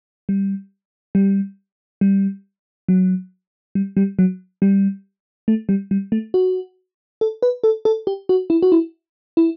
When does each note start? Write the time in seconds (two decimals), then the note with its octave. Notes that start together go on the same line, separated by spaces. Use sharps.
0.29 G3
1.15 G3
2.01 G3
2.88 F#3
3.75 G3
3.97 G3
4.19 F#3
4.62 G3
5.48 A3
5.69 G3
5.91 G3
6.12 A3
6.34 F#4
7.21 A4
7.42 B4
7.64 A4
7.85 A4
8.07 G4
8.29 F#4
8.50 E4
8.62 F#4
8.72 E4
9.37 E4